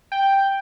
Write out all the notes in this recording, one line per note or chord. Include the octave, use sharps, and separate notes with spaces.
G5